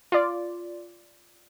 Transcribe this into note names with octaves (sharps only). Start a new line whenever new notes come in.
F4 D5